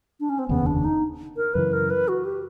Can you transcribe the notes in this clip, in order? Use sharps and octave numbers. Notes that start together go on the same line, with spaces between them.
D4
C#4
C4
F1 D#2 C#3 B3
D4
D#4
A#4
F#2 C#3 E3 B4
A#4
B4
F#4
G4